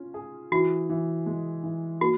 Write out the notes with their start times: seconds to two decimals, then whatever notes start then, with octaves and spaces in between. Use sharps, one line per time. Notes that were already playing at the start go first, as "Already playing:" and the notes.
Already playing: C#4 F4
0.14 G#4
0.52 E3 F#4
0.89 E3
1.26 G#3
1.64 E3
2.01 A#3 F#4